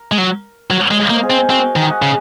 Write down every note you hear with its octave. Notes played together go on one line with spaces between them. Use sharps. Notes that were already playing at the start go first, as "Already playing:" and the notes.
Already playing: A#4
G#3
F#3
F#3 A#4 C#5
G#3
D#5
F5
A#3 C5 D#5
G#4 C5
C4
C4 F#4 A#4
D#3
G#5
D#5 F#5
C#3